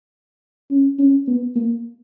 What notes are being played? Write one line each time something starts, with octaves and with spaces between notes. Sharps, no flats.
C#4
C#4
B3
A#3